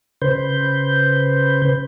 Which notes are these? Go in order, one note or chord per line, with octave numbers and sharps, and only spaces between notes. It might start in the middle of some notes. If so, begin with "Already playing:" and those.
C#3 B4 C5 G6